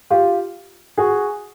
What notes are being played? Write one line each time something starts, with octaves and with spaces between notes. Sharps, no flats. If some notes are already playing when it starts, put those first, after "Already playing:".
F4 G4
F#4 G#4